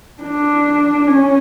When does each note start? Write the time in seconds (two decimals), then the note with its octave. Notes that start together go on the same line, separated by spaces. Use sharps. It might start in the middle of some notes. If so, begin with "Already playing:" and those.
0.23 D4
1.08 C#4